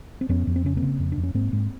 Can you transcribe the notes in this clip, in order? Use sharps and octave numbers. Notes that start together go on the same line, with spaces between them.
C4
F2 B3 C#4
F2
C4
C#3 C#4
A#3 C4
C#3
F2
D4
F2
C#4
G#2 A#3 C4
G#2